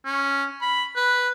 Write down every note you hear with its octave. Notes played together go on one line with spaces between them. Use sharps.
C#4
B5
B4